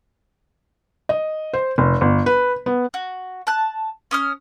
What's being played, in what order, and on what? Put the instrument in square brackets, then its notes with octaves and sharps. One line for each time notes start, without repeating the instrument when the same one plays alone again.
[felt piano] D#5
C5
F1
G1
B4
B3
[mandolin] F#4
A5 F#6
C#4 D#6 F6